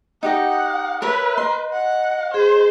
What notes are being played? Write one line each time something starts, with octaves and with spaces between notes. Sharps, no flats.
D#4 G4 D#5 F#5
A#4 B4 C#5 E5
D#5 C6
F#5
G#4 C5